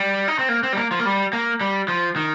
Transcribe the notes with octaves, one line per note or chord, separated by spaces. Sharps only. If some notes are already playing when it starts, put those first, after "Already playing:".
Already playing: G3
D#4
C4
A#3
C4
G3
A#3
F3
A#3
G3
A#3
G3
F3
D#3